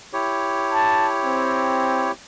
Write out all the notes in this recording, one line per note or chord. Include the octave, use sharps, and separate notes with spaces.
E4 G4 C#5
A5
C4